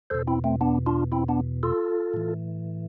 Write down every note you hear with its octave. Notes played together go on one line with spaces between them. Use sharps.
E2 B2 A4 C5
C4 E4
A3 C4
B3 D4
D4 F4
C4 E4
B3 D4
F4 A4
A2 E3